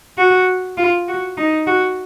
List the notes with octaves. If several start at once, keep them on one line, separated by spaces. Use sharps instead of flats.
F#4
F4
F#4
D#4
F#4